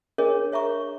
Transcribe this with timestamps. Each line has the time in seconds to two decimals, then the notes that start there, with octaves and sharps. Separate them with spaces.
0.18 D4 G#4 A#4 C#5 D#5
0.52 C#5 E5 A#5 C#6